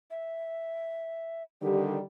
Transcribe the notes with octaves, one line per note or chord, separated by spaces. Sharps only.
E5
D3 D#3 G3 G4